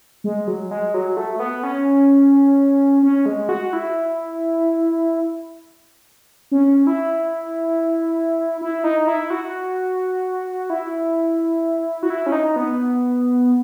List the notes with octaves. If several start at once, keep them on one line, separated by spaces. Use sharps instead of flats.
G#3
F#3
G#3
F#3
A3
B3
C#4
C#4
G#3
F#4
E4
C#4
E4
E4
D#4
E4
F#4
E4
F#4
E4
C#4
D#4
B3